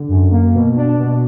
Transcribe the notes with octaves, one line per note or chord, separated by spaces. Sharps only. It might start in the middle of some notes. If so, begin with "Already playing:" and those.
Already playing: D3
F#2
A#3
B2
D4
B2